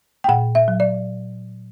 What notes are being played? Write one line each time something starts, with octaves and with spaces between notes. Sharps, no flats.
G5
A#2 F#5
E5
F#3
D5